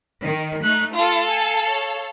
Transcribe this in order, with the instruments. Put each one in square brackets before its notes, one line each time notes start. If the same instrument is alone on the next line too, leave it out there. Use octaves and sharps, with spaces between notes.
[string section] D#3
[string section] A3 D#4 [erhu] F#6
[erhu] F4 [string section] A4 F5
[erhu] G#5
C#5